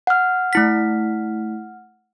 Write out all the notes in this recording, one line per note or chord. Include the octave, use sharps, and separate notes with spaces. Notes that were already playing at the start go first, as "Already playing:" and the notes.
F#5 F6
A3 E4 B6